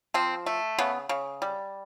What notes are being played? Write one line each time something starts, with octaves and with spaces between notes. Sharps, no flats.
F3 C4
A3
C#3 B3
C#3
G3